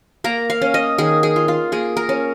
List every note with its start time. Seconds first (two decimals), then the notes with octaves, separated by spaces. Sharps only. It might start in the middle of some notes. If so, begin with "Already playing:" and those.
0.24 A#3 A#5
0.50 F5
0.62 C#4
0.74 D#5
0.98 D#3 G#4
1.23 G#4
1.36 F4
1.48 F4
1.72 A#3 G#4
1.97 A#4
2.09 C#4